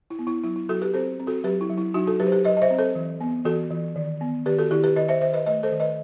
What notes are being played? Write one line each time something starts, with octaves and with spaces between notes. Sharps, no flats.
E4
B3
E4
F#3 E4
E4
F#3 F#4 A4
G4 B4
C4 A4 C5
C4
F#4 A4
F#3 G4 B4
E4
F#3
E4
F#3 D#4 F#4
F#4 A4
F#3 G4 B4
C5
G4 B4
F#3 B4 D#5
D#5
C5 E5
C4
A4 C5
E3
B3
E3 F#4 A4
E3
D#3
B3
D#3 G4 B4
F#4 A4
D#3 E4 G4
G4 B4
D#3 B4 D#5
C5 E5
D#3 C5 E5
B4 D#5
A3 B4 D#5
A4 C5
D#3
B4 D#5